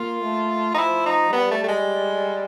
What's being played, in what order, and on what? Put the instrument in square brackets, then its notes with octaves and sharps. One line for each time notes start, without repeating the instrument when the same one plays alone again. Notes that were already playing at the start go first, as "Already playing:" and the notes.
Already playing: [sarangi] A#3 [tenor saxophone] F4
[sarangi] A3
[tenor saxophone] D#4
[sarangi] F3 [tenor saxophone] E4
[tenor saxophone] D#4
[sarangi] G3 [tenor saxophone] B3
[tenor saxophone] A3
A3
G#3